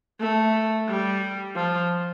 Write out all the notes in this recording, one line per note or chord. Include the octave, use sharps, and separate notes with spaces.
A3
G3
F3